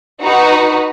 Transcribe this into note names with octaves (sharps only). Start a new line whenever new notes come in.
D#4 F#4 B4